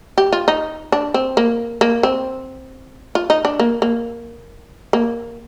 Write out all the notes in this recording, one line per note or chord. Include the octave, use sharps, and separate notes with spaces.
G4
F4
D#4
D4
C4
A#3
A#3
C4
F4
D#4
D4
A#3
A#3
A#3